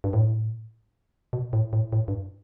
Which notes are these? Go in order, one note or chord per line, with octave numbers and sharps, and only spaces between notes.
G2
A2
B2
A2
A2
A2
G2